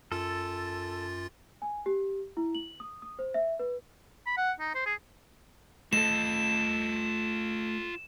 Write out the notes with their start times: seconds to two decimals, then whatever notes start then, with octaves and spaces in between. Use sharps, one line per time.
0.12 F#2 F4 A4 A6
1.62 G#5
1.86 G4
2.37 E4
2.55 F#7
2.80 D#6
3.02 D#6
3.19 C5
3.34 E5
3.59 B4
4.26 B5
4.37 F#5
4.59 D#4
4.74 C5
4.86 G#4
5.93 A3 F4 A4 D#5 E7